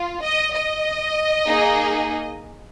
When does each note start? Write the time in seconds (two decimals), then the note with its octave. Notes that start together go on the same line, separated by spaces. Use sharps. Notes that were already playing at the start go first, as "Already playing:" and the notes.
Already playing: F4
0.22 D#5
0.54 D#5
1.47 A#3 D#4 G#4